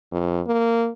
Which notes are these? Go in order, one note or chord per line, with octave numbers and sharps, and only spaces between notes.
F2
A#3